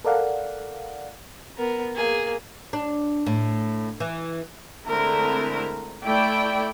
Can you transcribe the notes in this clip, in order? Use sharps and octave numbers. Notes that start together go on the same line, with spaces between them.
A4 A#4 D5 F5 F#5
B3 A#4
A#3 G#4
D4
A2
E3
D3 G#3 A3 C4 E4 A#4
A3 E4 D5 G5